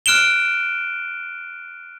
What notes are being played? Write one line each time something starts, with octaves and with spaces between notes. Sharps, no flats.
F6 F#6 D7 E7 G7